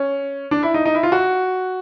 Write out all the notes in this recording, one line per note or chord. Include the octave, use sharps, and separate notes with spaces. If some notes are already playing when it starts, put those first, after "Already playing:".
Already playing: C#4
D4
E4
D#4
D#4
E4
F4
F#4